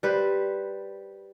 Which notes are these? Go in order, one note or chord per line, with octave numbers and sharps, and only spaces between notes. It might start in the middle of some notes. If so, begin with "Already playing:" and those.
G3 B4 C5